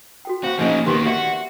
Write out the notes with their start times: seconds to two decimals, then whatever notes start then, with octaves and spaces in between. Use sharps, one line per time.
0.25 F#4 A4 G5
0.44 C4 F#4 C5 F5 C#6
0.59 F3 A#3 C#4 D#4 G#4
0.86 D#3 A#3 B3 G4 C6 C#6
1.06 F#4 D5 E5 F#5